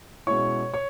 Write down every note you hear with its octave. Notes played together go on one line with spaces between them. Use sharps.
B2 G#3 C#4 E4 C#5 C#6
C#5 C#6